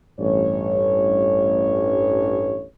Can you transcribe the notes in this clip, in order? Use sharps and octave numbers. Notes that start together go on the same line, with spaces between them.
A1 G2 C#5